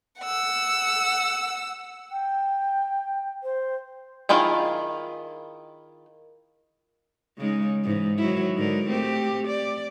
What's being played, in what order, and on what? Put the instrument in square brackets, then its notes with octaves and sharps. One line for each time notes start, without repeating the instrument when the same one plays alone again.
[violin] F#5 E6
[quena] G5
C5
[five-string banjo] D#3 E4 F4 G#4 E5
[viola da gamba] C#3 G#3 D#4
G#2 E3
D#3 F#3 E4
G#2 D3 A#4
A3 C4 G4
D5